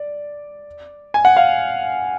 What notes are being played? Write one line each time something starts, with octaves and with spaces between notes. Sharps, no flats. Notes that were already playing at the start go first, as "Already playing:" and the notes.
Already playing: D5
G#5
F#5
F5